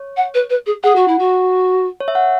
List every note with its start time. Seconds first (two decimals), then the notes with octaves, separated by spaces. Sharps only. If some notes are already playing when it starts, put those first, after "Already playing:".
Already playing: C#5
0.17 F#5
0.34 B4
0.50 B4
0.66 G#4
0.83 G#4 F#5
0.96 F#4
1.08 E4
1.19 F#4
2.01 C#5
2.08 E5
2.15 F#5